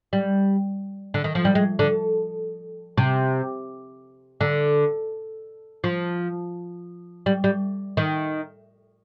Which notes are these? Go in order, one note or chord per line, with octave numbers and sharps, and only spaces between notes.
G3
D3
D#3
F3
G3
G#3
D3
C3
D3
F3
G3
G3
D#3